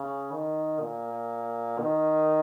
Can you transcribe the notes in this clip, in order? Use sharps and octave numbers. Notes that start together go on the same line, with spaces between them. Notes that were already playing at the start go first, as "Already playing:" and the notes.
Already playing: C#3
D#3
A#2
D#3